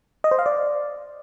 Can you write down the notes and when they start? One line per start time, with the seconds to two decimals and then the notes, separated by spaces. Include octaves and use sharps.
0.24 D#5
0.31 C5
0.39 F5
0.46 D5